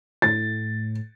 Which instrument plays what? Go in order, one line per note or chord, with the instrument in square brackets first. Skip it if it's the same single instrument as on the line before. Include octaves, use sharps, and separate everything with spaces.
[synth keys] A2 [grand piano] A6